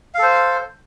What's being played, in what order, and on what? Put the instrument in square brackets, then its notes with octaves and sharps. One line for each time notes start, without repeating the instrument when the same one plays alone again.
[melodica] F5
A4
C5